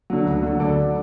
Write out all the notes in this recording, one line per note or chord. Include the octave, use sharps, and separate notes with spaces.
D3 F#3
D2
D3 F#3
D2 A4 D5
D3 F#3